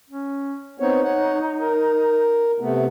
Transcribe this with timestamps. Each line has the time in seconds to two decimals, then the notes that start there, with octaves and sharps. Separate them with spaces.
0.10 C#4
0.80 B3 C4 D#4 C#5
1.03 C#5 F#5
1.61 A#4
2.60 C3 A3 B3